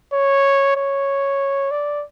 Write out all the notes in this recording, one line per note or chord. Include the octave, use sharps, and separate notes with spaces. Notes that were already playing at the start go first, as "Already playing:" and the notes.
C#5
C#5
D5